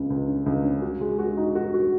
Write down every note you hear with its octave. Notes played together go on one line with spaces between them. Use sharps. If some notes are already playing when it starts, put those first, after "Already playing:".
Already playing: C#2 C#3
C#2
C#4
C#2
C#4
F#4
G#3
F#4
D#4
F#4
F#4